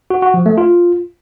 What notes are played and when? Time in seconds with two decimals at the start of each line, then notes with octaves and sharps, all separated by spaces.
0.10 F#4
0.22 F#4
0.34 F3
0.46 A3
0.58 F4